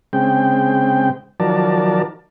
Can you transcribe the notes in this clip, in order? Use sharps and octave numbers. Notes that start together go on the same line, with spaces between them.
C#3 G#3 C4 G5
D#3 F3 F#3 A#4 D5 A5